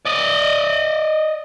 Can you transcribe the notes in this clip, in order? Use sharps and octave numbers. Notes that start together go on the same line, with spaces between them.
D5 D#5